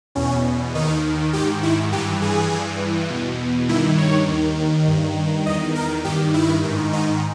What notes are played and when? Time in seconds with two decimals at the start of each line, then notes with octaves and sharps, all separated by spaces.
0.15 E2 B2 C#4
0.74 D#2 D#3 D#4
1.33 G#2 D#3 G4
1.63 E4
1.92 G2 E3 G4
2.22 G#4
2.51 G2 E3
3.10 E2 B2
3.69 G2 D#3 E4
3.98 C#5
4.28 D#2 D#3
4.87 G2 D#3
5.46 E2 D#3 D#5
5.75 A#4
6.04 G2 D#3 G4
6.34 E4
6.63 G#2 D#3
6.93 D#4